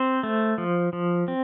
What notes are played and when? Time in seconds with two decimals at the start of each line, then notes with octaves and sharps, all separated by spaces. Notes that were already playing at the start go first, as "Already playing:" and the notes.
Already playing: C4 C5
0.23 A3
0.58 F3
0.93 F3
1.28 C4